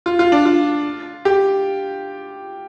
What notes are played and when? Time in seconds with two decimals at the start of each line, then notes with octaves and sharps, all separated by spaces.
0.06 F4
0.19 F4
0.32 D4
0.45 F4
1.25 G4